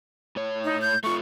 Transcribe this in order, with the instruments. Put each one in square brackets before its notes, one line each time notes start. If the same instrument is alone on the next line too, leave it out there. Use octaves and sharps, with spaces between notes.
[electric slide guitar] A2 C#5
[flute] D#4
G6
[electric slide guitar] A3 F4 [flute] C#6